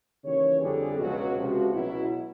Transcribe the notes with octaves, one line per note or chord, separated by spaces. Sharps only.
D#2 C#3 E3 G3 C#5
F2 D3 G3 G#4
C#2 B2 F#3 F#4
C#2 C3 F3 F#4
C#2 B2 F#3 E4